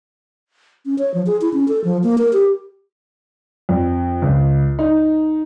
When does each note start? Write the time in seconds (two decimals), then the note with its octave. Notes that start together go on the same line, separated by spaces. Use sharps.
0.86 C#4
0.99 C#5
1.14 F3
1.26 G#4
1.41 E4
1.53 C#4
1.68 A4
1.84 F3
2.03 A#3
2.18 A#4
2.33 G4
3.69 F2
4.22 C#2
4.79 D#4